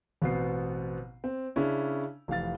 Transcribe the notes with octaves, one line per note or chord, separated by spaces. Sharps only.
A1 B2 B3 C4 C7
C4
C#3 C#4 D4 E4
F1 E3 F5 A6